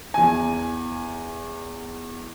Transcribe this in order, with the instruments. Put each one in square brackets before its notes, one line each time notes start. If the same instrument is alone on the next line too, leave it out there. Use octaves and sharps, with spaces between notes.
[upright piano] E2 G#5